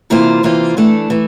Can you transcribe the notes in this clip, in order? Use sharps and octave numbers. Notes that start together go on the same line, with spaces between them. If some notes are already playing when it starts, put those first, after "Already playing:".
C3 E3 A#3 F4 C5
C3 E3 A#3 F4 C5
E3 A3 D4 A4
E3 A3